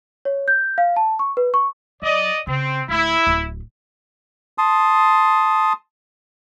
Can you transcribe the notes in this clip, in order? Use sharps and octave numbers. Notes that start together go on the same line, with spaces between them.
C#5
G6
F5
A5
C#6
B4
C#6
F#3 D5 D#5
C#3 C4
D1 D2 E4
D1 A3
A5 C6 D#6